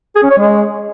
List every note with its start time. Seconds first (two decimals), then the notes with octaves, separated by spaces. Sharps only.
0.15 G#4
0.23 C#4
0.31 C#5
0.38 G#3